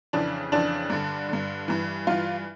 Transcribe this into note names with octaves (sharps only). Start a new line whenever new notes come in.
F2 C#3 E3 D4
F2 C#3 E3 D4
G2 D3
G2 D3
G2 E3
G2 E3 F4